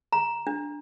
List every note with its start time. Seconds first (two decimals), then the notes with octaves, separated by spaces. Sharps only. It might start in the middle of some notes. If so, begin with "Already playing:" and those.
0.12 A#5
0.47 D4